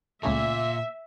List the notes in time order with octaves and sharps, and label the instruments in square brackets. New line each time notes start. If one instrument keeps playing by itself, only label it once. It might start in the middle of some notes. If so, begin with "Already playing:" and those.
[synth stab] C#2 C#3 A3 [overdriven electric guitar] A#2 [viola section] E5